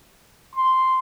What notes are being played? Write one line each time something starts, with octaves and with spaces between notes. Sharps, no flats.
C6